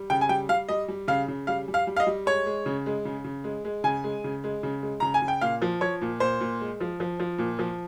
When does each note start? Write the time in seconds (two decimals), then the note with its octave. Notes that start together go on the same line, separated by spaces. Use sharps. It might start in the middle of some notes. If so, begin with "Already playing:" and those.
Already playing: G3
0.10 C#3 G5
0.21 G#5
0.29 G3 G5
0.49 G3 F5
0.69 G3 D#5
0.88 G3
1.08 C#3 F5
1.28 C#3
1.47 G3 F5
1.68 G3
1.74 F5
1.87 G3
1.96 F5
2.00 D#5
2.07 G3
2.26 G#3 C#5
2.46 G#3
2.66 C#3
2.86 G#3
3.05 C#3
3.24 C#3
3.44 G#3
3.65 G#3
3.84 C#3 G#5
4.04 G#3
4.24 C#3
4.44 G#3
4.63 C#3
4.82 G#3
5.00 C#3 A#5
5.14 G#5
5.22 C#3
5.28 G5
5.41 A#2 F5
5.62 F3
5.81 F3 C#5
6.02 A#2
6.20 A#2 C5
6.41 A#2
6.61 G#3
6.80 F3
7.00 F3
7.20 F3
7.39 A#2
7.59 F3